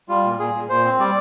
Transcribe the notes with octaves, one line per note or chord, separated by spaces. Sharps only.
G3 F4
A#2
A#2 G#4
A#2
A#2 C5
C4
G3 D5